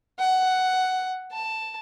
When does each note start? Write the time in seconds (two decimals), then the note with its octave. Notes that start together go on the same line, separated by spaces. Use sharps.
0.19 F#5
1.32 A5